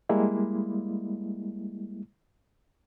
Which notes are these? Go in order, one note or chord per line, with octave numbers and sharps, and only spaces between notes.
G3 G#3 A#3 E4